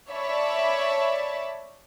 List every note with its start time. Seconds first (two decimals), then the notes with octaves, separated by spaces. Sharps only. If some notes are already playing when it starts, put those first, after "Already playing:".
0.10 C#5 D5 E5 A5 B5